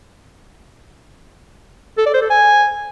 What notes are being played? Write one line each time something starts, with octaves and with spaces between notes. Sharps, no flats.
A4
D5
C5
A4
G#5